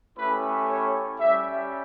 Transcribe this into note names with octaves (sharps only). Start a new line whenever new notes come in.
A3 C#4 E4 G4 B4
C#5
G3 C#4 G4 E5